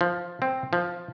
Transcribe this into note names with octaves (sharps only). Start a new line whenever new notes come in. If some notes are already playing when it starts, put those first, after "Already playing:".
F3
C4
F3